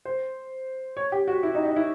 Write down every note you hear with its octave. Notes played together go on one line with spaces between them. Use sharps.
C5
C#5
G4
F#4
E4
D#4
D#4
E4